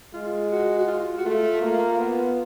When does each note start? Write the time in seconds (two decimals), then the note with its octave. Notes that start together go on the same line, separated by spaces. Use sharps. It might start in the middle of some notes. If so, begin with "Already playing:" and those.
0.14 G#3 F4
0.52 F#4
0.78 F#4
0.87 F4
1.18 F#4
1.25 A3 F4
1.62 A#3
1.99 B3